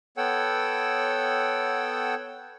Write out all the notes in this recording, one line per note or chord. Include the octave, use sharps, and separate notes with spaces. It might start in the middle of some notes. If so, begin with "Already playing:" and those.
B3 A4 C#5 F#5 G5 E6